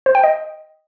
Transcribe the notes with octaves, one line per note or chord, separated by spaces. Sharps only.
C5
G5
D#5